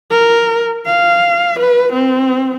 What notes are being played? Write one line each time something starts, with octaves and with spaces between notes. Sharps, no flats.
A#4
F5
B4
C4